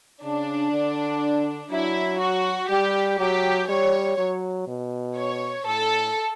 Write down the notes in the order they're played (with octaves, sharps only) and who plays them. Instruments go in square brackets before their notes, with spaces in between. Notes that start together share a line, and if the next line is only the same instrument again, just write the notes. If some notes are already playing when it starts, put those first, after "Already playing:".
[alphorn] C#3 [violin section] D4
[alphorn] D3
[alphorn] F#3 [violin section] E4
[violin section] F#4
[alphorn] G3 [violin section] G4
[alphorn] F#3 [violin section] G4
[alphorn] G3 [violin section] C#5
[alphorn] F#3
B2
[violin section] C#5
[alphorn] A2 [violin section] A4